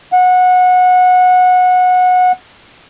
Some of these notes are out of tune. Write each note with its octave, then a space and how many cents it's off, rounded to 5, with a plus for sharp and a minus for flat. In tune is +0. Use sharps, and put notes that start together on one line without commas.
F#5 -20